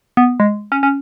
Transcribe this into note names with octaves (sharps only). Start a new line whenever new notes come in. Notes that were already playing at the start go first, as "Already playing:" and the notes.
B3
G#3
C#4
C#4